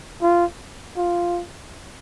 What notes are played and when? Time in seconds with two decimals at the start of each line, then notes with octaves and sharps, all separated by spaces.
0.22 F4
0.97 F4